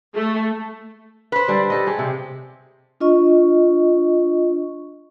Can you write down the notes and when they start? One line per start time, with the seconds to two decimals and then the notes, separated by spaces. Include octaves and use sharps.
0.14 A3
1.32 B4 C5
1.48 D3 G3 D4
1.70 G4 A4 D#5
1.86 G4 G#4 C5
1.99 C3 C4
3.00 D4 F4 D#5 C#6